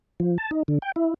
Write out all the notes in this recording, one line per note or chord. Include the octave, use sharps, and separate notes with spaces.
F3
A5
D#4
D3
G5
E4